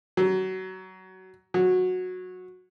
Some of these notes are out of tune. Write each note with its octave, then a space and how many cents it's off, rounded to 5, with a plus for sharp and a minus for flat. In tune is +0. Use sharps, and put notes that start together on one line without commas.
F#3 +25
F#3 -10